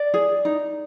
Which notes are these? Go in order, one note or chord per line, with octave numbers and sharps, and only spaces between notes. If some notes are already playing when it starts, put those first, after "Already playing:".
Already playing: D5
G#4
D#4